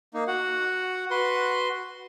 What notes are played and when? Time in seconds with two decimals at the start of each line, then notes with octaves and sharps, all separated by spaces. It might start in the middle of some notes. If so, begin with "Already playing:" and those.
0.14 A#3 D#4
0.28 F#4 F#5
1.11 F#4 B4 C6